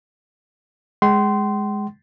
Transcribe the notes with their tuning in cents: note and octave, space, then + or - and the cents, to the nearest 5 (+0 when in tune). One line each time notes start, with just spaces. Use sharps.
G#3 -5 G5 -40 C6 -10